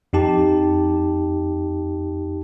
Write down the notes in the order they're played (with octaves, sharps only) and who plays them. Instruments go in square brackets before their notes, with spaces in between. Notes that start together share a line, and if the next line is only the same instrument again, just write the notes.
[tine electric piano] F2 D#4 G4 A5